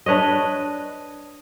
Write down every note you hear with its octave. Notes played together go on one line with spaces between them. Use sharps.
D4 B4 C#5 D#5